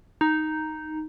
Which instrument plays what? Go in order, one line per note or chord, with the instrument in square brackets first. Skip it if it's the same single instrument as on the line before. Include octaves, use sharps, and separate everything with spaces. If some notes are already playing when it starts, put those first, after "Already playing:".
[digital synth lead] D#4